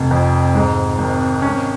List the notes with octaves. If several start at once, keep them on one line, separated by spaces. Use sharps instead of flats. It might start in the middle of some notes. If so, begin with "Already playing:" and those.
Already playing: F1
F2
G#2
G#1
C#4